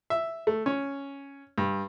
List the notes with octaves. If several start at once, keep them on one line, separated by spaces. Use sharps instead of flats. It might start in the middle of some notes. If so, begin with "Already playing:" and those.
E5
A3
C#4
G2